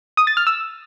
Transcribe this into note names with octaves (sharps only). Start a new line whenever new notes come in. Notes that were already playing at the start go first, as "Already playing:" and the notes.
D#6
A6
F6
E6